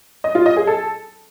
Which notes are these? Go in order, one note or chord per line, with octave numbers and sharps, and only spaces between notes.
D#5
F4
D#5
G#4
A4